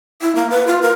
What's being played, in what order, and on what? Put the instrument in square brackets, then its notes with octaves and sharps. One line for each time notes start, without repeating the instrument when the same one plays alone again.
[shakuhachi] E4
A#3
B4
F4
A#4